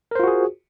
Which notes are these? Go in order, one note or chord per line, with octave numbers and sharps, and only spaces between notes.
F4 F#4 G#4 A#4 C5